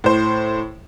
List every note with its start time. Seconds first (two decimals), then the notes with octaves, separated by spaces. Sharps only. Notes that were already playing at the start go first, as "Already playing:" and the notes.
0.04 A2 C5